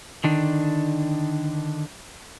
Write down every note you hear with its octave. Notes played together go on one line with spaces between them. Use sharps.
D3 D#3 D4